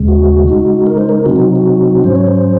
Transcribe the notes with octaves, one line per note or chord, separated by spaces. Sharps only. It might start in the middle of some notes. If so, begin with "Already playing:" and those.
Already playing: D#2 C#3 G#3
F#4
C#3 G#3 D#4
A#4
C5
A#4
C3 F#3 C4 D#4 F#4
F#4
F#4
G#2 F#3 C#4 C5
C#5
C5